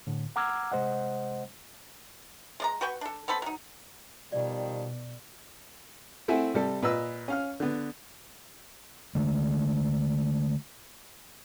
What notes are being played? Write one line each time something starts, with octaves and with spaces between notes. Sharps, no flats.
A2 D3
F#5 A#5 D6 E6 F6 G#6
C3 G#3 C5 D#5 F#5
G#3 D5 A#5
F#4 B4 G5 C#6
D4 A4
B3 C4 A4 B5
F#3 D#4
B2 D#3 F3 G3 D5
A3 C4 E4 E5 F#5 G#5
C3 G3 A4
A#2 B4 D#5 E6
C#4 F5 F6
D3 B3
D3 G#3 A3